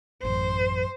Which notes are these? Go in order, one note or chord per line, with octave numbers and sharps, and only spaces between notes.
A1 F#2 C5